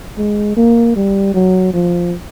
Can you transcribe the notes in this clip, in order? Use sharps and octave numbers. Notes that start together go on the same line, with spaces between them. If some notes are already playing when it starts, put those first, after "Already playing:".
G#3
A#3
G3
F#3
F3